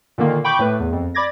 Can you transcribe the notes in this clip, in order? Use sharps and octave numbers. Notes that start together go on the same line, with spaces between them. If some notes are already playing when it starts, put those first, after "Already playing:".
A#2 D3 D#3 A#3
G5 B5 C#6 D6 G6
A2 A3 B4
E2
F2
D5 B5 D6 G#6 A#6